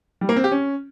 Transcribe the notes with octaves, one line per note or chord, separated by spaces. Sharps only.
G3
A#3
C4
G4
C#4